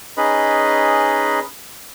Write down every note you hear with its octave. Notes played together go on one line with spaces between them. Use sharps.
C#4 D#4 G#4 B4 D#5 B5